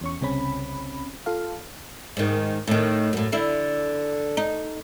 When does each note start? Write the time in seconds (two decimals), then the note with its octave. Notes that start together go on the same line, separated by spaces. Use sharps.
0.01 E2 C#4 C#6
0.21 C2 C#3 C4 C#4 B5
1.26 F4 A4 F5
2.17 G#2 D#3
2.68 A2 D#3
3.13 F#2 A2
3.32 D3 E4
4.37 D#4